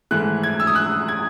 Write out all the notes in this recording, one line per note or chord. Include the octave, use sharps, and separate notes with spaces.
G#2 E3 A3 F#6
G#6
E6
D#6
F#6
G#6